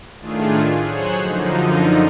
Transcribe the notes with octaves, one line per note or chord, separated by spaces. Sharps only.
A2 D#3 A3 D4 F4 G#4
F#3 G#4 C5 C#5 F#6
F#2 D3 F3 D#4